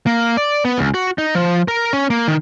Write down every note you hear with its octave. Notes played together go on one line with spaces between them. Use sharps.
A#3
D5
B3
C#2
F#4
D#4
F3
A#4
C#4
A#3
D#3